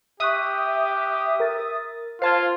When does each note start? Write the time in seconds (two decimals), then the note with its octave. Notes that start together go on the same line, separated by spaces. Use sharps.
0.20 G4 E5 C#6 D#6 F#6 B6
1.40 A#4 A6
2.22 F4 C5 F5 A5 C6 G#6